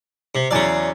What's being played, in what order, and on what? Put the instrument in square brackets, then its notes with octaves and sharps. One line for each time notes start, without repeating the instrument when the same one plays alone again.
[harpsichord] C3
[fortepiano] E2 F#3 [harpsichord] C#3 D5